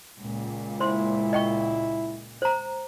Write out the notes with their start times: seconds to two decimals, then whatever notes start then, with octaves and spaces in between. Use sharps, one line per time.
0.19 C#2 A#2
0.80 E4 C5 C6
1.33 D#5 G5 C#6
2.42 C5 A#5